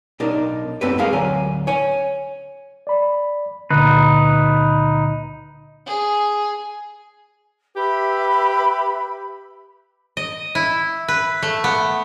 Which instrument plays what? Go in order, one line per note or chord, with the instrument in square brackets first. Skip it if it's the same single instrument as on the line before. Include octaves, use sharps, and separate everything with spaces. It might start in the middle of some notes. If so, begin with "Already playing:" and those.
[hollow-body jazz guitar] B1 D4 D#4 A#4
F#2 A3 C4 G4 B4
G#3 A3 G#4 A#4 F5
D2 F#3 G#5
C#5 G#5
[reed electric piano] D5 B5
[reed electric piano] C#2 A#2 D3 [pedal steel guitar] D#4 B4
[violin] G#4
[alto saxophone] G4 [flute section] B4 E5 B5
[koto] D#5
E4
B4
A3
B3